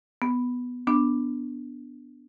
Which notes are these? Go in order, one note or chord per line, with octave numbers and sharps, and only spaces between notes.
B3
B3 D4